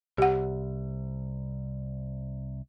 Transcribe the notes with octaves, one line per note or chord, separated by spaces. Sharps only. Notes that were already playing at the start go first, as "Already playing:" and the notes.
C2 G4 F#5